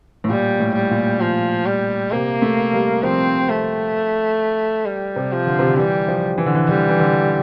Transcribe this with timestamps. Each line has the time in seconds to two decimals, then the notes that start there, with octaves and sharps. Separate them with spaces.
0.24 A2
0.29 A#2 G3
0.60 A2
0.75 G3
0.91 A#2
1.21 F3
1.66 G3
2.11 C3 A#3
2.42 A3
2.73 G3
3.03 F3 C4
3.49 A3
4.86 G3
5.16 C3
5.32 F3
5.47 D3
5.59 C3
5.68 D3
5.77 E3 G3
6.08 F3
6.38 E3
6.46 D3
6.55 E3
6.68 D3 G3
6.89 E3
6.99 D3